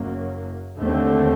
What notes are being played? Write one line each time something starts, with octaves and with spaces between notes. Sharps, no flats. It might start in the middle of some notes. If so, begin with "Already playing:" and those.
Already playing: F#1 F#2 F#3 A#3
D#2 D3 A3 C4